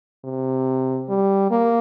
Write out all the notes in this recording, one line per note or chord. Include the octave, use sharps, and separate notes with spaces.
C3
G3
A#3